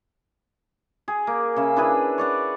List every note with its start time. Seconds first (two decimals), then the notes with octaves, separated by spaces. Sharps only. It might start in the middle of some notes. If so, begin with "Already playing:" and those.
1.08 G#4
1.27 A#3
1.56 C#3 E5
1.76 D4 E4 G#4 B4
2.18 C#5 D5 F#5